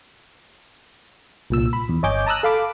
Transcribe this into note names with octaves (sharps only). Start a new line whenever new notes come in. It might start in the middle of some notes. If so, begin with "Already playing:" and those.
C2 A#2 E6
B5
E2
G1 C#5 D#5 G#5 D6 G6
A5 A#5 D#6 E6 F#6
A4 F5 B5 D6